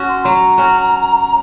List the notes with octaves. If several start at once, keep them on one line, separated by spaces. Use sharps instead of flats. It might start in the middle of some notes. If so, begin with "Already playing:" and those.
Already playing: C#4 F#4
C6
F#3 A#5
C#4 F#4